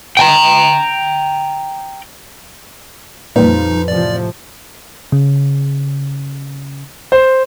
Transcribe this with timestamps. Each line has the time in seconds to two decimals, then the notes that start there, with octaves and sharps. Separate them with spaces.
0.17 G5 G#5 A#5
3.36 F2 A#2 F3 G3 D#4 B4
3.88 A2 C3 F3 D5
5.12 C#3
7.12 C5